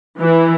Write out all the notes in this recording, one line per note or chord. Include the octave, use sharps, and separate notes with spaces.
E3